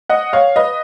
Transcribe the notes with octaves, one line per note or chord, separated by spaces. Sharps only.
D#5 F#5
C#5 F5
B4 D#5